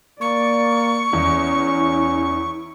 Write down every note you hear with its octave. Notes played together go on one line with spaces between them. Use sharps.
A#3 D5 C#6
E2 C#4 E4